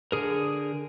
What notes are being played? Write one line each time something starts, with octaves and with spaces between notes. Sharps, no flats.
D3 G#4 A#4